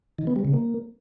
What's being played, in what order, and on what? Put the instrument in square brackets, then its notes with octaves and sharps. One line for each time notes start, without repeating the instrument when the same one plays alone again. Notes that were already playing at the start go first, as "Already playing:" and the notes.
[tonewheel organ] D#3
B3
G3
C#3
A#3